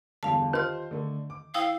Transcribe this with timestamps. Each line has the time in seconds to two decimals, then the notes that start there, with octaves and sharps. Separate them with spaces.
0.23 E2 G2 D3 F5 A5
0.53 D#3 F4 G4 C5 F6
0.91 D3 A3 A4
1.30 D6
1.54 E4 F5 G5 D#6